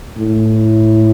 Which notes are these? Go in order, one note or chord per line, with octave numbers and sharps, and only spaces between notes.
A2